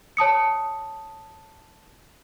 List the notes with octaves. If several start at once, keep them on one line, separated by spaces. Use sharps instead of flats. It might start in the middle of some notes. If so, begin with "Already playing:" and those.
C#5 A5 D#6 C#7